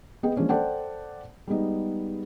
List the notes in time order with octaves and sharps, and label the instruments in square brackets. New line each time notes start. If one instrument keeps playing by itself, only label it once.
[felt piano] B3 G#4 D#5 G5
F3 G#3 A#3 C#4 D4
A4 C5 D5 F#5 G5 A5
G3 G#3 B3 D#4